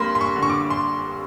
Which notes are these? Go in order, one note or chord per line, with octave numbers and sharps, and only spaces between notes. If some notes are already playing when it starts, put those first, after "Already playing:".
Already playing: G2 G3 A#3 B5 C6
C6
C#6
D3
C#6
D6
C6